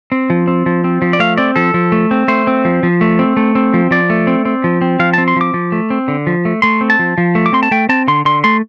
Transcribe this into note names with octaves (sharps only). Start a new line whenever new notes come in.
C4
F3
C4
F3
C4
F3
D5
A3 F5
C4 D5
F3 A4
F3
A3
C4
A3 C5
C4
F3
F3
A3
C4
A3
C4
F3
F3 D5
A3
C4
C4
F3
C4
F3 F5
A5
C4
C6
F3 D6
F3
A3
C4
D3
F3
A3
A3 C6
C4
A5
F3
F3
A3
D6
C4 C6
A5
A3 G5
C4 A5
D3 C6
D3 C6
A3 C6